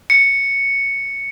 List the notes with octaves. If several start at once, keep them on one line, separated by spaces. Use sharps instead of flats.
C#7